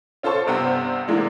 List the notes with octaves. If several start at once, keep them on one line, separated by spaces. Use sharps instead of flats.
C#4 F4 A4 C5 A5 C#6
G2 C3 B3 C4
C3 D#3 E3 G#3 A#3 D4